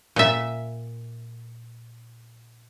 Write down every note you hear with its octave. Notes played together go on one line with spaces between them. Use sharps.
A#2 E5